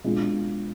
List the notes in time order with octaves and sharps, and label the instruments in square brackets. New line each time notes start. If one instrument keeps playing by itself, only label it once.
[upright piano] B2 G#3 D4 F4